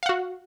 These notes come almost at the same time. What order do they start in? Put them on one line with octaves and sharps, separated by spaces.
F5 F#5 F#4